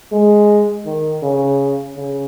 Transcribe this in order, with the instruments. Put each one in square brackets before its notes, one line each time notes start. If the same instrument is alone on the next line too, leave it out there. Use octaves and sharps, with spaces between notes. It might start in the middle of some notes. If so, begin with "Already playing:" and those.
[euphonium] G#3
D#3
C#3
C#3